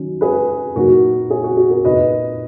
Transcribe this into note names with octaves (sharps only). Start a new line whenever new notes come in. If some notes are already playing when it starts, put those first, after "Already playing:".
Already playing: D#3 F#3 C#4
G#4 B4
A#2 F#3 A#3 D#4 F#4 A#4
G#4
F#4
G#4
F#4 A#4
A#2 A#3 D#4 B4 D#5